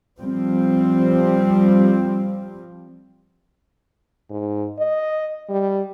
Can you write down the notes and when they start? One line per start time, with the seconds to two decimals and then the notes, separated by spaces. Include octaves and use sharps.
0.19 F3 G3 C4
4.30 G#2
4.79 D#5
5.49 G3